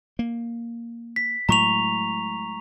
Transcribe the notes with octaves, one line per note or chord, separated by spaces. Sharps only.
A#3
B6
A2 F#3 G#3 A#5 C#6 F7